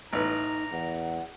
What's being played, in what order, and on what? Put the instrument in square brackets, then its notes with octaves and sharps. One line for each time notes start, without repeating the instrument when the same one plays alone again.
[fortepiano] A1 B4 [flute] D#4 [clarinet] A#5
[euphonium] E2 [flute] F#5